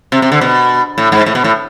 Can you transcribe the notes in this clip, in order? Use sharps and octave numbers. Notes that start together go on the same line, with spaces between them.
C3
C3
D3
B2
A2
G#2
A2
B2
A2